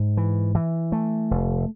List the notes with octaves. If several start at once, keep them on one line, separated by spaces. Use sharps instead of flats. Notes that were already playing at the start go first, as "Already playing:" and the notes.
Already playing: G#2
E3
E3
A3
F1